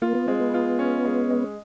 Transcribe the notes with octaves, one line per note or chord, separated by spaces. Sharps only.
A#3 F4
B3
G#3 C4
B3
F4
C#4
G#3
G#3